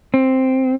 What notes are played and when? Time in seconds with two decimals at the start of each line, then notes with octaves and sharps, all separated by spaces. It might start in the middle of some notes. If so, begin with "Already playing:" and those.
0.14 C4